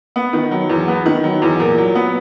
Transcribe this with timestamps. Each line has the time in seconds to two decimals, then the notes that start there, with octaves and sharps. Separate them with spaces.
0.16 B3
0.33 D#3
0.51 F#3
0.69 E2
0.88 B3
1.06 D#3
1.24 F#3
1.42 E2
1.60 A#2
1.78 F#3
1.95 B3